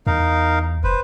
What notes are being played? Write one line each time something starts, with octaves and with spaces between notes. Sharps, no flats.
E2 D#4 A#4 F5
F1 B4 C5